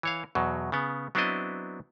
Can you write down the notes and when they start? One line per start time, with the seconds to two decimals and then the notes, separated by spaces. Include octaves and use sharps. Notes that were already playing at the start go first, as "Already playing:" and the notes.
0.03 E3 C#5 F5
0.35 E2 B2 F#3
0.72 C#3 B3
1.15 F#3 B3 C4 D4 E4 D#5